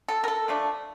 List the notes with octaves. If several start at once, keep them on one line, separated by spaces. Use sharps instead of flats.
A4
A#4
A4
F3 A3 D4